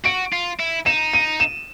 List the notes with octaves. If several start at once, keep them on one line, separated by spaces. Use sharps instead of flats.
F#4 D7
F4
E4
D#4 E7
D#7
E7